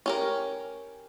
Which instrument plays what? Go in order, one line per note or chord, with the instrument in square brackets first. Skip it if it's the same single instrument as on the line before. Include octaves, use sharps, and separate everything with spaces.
[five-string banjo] C#4 G4 A#4